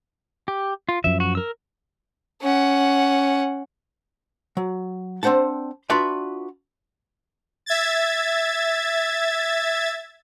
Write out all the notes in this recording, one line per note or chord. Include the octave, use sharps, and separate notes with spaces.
G4
F4
F#2 F3 E5
F#4
A#4 E6
C#4 F#5
F#3
C4 D4 C5 F#5 A5
D4 F4 F#4 B4 D5 E5
E5 G#6 A6